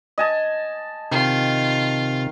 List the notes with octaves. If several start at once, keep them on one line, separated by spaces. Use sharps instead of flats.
D#5 G#5 A5
C3 D#3 F4